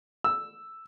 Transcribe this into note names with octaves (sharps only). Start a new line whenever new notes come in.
E6